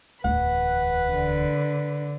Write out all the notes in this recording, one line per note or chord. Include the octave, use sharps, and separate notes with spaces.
D1 E2 B4 F#5
D3